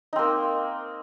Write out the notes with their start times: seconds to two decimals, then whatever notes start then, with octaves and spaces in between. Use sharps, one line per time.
0.13 D#4
0.16 C4
0.19 A#3